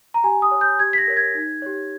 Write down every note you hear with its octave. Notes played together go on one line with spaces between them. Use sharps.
A#5
G4 G#5
D#6
C#5
G6
G4 G#6
B6
A#6
A#4 C#5
G#6
D#4
G4 C#5